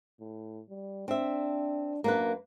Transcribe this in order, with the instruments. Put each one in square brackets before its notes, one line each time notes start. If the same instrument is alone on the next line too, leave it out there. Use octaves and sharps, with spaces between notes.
[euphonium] A2
G3
[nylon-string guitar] C4 E5 [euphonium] D4
[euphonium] F#2 [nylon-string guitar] A#3 D4 B4